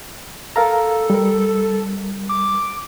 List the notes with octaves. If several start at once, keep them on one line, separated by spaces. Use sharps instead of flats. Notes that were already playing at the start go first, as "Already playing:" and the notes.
A4 A#4 F5 A#5
G3 A#4
D6